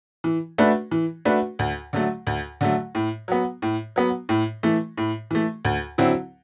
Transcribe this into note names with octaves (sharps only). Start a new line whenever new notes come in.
E3
A3 D4 F#4 B4
E3
A3 D4 F#4 B4
D2
D3 F#3 A3
D2
D3 F#3 A3
A2
F#3 B3
A2
F#3 B3
A2
E3 A3
A2
E3 A3
D2
D3 F#3 C4 E4